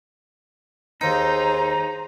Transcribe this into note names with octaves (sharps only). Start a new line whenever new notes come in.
D#2 D#4 G#4 C5 G5 A#5